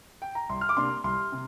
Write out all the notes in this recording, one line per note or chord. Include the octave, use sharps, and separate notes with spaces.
G5
A#5
C2 C6
F6
D6
C3 A#3 D4 C6
C2 C6
C3